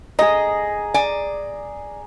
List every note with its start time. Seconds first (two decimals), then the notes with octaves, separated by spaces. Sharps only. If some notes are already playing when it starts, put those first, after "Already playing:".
0.19 G#4 D#5 A#5
0.94 D5 G#5